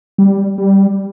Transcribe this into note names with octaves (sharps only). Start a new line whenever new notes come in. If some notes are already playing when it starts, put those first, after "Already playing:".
G3
G3